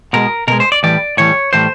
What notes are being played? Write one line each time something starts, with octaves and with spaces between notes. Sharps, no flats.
B2 G#3 A#4
B2 G#3 A#4
C5
D5
A2 E3 G3 D5
A2 E3 G3 C#5
A2 E3 G3 C5